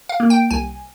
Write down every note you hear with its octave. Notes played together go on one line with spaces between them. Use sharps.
F5
A#3
G5
C2 G#5